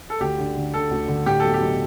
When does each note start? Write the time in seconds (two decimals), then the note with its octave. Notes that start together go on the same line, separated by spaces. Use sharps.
0.10 A4
0.20 D2 G4
0.38 D3
0.56 D3
0.74 D3 A4
0.91 D2
1.08 D3
1.26 A2 G4
1.40 B1 A4
1.54 G4
1.61 B1